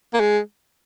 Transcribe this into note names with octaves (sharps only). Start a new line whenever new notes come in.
A#3
G#3